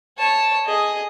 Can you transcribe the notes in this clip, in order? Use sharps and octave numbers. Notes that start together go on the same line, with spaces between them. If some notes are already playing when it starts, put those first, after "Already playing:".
C#5 A5
G#4 D#5